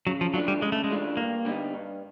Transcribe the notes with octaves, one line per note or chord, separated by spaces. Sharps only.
C#3 F#3
F3
E3 F#3 A3 D4 F4
G3
C#3 G#3
A3
G#3
E3 A3 D4 F4
G2 A#3
D3 G3 B3 D#4
G2